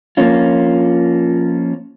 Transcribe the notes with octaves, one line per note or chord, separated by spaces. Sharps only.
F3 A#3 C#4 F4